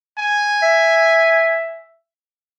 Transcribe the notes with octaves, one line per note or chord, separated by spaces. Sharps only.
G#5
E5